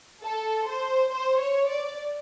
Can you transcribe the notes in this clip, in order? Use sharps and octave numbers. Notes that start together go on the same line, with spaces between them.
A4
C5
C5
C#5
D5